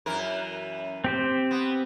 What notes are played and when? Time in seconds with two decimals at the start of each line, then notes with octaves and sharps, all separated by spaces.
0.06 F#2 E3 A#4
1.04 C4 G4 C5
1.51 B3